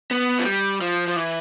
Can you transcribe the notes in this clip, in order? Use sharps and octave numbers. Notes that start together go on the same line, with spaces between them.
B3
F3
G3
F3
F3
E3